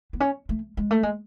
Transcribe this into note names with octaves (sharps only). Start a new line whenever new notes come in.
B3
C#4
A3
G#3
A3
G#3